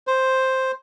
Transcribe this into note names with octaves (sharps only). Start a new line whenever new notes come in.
C5